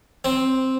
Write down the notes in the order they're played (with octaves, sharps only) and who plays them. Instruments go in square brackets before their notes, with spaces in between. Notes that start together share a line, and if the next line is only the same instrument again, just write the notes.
[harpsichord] C4